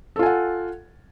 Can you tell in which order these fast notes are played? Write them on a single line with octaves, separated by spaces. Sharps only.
A4 F4 G#5 F#5